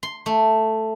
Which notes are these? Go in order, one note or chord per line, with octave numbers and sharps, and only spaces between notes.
C6
A3